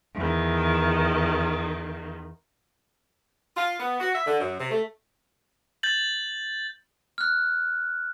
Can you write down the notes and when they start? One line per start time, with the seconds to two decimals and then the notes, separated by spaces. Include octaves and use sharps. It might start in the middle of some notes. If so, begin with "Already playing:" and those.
0.15 E2 D#3
3.56 F4
3.79 B3
4.00 F#4
4.14 E5
4.26 D3
4.39 F#2
4.58 C3
4.70 A3
5.83 G6 A6 F#7
7.18 F6 F#6